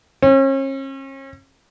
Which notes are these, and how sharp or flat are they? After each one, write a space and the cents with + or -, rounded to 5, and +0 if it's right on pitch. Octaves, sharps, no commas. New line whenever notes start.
C#4 -40